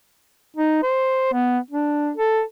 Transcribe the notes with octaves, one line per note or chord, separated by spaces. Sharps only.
D#4
C5
B3
D4
A4